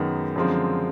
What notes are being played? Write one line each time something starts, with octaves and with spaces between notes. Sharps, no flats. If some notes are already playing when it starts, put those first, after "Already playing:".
Already playing: F#2 D#3 G#3 B3
F#2 D3 F3 G#3 C4